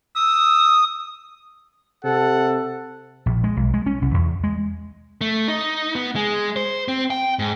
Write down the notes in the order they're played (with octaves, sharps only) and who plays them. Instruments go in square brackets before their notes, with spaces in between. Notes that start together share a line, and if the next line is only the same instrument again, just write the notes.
[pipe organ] D#6 [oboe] E6
[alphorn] C3 [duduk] A4 [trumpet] F#5
[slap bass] A#1
G#3
B1
G#3
C#4
C2
E2
G#3
[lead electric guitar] A3
D#4
B3
G#3
C5
C4
G5
G#2